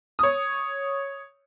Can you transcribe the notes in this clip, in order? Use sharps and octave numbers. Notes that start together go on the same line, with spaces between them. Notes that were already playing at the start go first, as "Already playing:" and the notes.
C#5 D#6